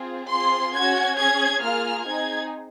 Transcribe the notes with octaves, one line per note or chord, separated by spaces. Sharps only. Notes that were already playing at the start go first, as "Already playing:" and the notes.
Already playing: C4 F4 G#4
C4 F4 G#4 C6
C#4 F#4 G#6
C#4 G#4 G#6
A#3 F4 G#4 F6
C4 D#4 G#4 G#6